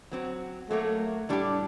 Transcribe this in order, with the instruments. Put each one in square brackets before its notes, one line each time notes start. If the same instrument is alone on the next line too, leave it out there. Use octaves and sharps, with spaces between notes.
[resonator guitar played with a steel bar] F#3 C4 F#4
[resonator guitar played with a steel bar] F#3 A#3 F#4 [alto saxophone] A3
[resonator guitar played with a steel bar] A2 G3 D4 G4